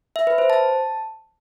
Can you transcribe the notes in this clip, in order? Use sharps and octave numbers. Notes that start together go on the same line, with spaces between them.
E5
B4
C5
A5